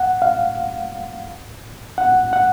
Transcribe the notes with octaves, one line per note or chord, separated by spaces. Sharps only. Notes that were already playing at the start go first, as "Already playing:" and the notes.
Already playing: F#5
F5
F#5
F#5